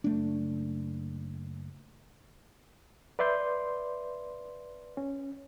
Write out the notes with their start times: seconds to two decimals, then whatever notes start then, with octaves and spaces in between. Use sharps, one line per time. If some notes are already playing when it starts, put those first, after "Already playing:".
0.04 F#1 A3 D4
3.19 B4 D5 E5 C6 G6
4.97 C#4